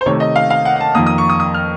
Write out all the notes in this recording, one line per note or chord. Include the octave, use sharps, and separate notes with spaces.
C5
C3 D#3 A3 C#5
D#5
F5
F5
F#5
F#5
A5
F2 D#3 A#3 D#6
D#6
C#6
D#6
D#6
F6